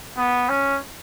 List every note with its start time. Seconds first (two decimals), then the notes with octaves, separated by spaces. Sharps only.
0.18 B3
0.49 C#4